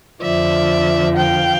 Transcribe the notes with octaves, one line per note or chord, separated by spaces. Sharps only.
F2 D3 F3 D5 E5
F5 G5